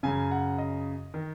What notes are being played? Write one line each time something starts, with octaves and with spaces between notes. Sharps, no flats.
F#2 C#3 G#5
F#5
D#5
D#3